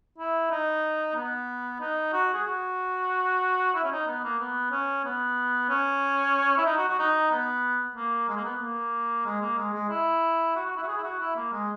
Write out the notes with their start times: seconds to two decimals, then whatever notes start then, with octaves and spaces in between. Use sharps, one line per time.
0.18 E4
0.51 D#4
1.16 B3
1.81 D#4
2.13 F#4
2.34 G#4
2.45 F#4
3.74 E4
3.84 C#4
3.92 D#4
4.07 B3
4.24 A#3
4.40 B3
4.72 C#4
5.05 B3
5.69 C#4
6.58 E4
6.66 D#4
6.78 F#4
6.89 F#4
6.99 D#4
7.31 B3
7.96 A#3
8.29 G#3
8.37 A#3
8.45 B3
8.61 A#3
9.25 G#3
9.41 A#3
9.58 G#3
9.74 G#3
9.90 E4
10.56 F#4
10.66 F#4
10.76 E4
10.83 F#4
10.88 G#4
10.97 E4
11.03 F#4
11.19 E4
11.36 A#3
11.53 G#3